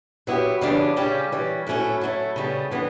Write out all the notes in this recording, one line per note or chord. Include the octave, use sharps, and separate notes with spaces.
F#3 B3 E4 G4
C#3 E3 G3 B3 D4
C#3 G3 C#4 G4
E3 G3 C#4
A2 F#3 A3 C#4 E4
F#3 A3 E4
C#3 G3 B3 F#4 A4
A2 E3 B3 D4